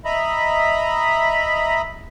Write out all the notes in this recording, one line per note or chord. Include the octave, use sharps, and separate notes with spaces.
D#5 E5 A#5 B5